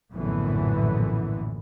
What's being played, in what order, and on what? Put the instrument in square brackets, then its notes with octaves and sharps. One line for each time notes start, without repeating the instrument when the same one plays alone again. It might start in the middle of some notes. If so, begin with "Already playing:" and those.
[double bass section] A#1 F#2 A2 D3 E3 B3